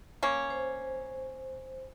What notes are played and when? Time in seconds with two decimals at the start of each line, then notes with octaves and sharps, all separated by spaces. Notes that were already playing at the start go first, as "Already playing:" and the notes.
0.23 A#3 C#4
0.50 C5